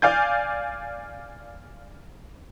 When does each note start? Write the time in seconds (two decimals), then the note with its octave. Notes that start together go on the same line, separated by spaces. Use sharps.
0.02 D5 F5 G#5 G6